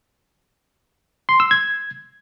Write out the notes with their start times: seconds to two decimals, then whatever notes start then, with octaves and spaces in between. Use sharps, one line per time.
1.29 C6
1.40 E6
1.51 G#6